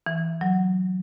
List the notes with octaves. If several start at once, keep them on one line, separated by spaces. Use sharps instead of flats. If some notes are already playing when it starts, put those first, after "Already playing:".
E3
F#3